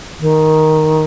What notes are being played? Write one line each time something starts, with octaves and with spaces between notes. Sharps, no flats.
D#3